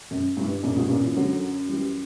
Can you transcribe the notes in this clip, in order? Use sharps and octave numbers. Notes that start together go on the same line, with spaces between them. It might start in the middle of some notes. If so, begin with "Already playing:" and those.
F#2
G2 E3
D3
F#2 A#2 C#3
G2 B2
F#2 A#2 C#3
C#3 E3
F#2 D3 F#3
E3 G3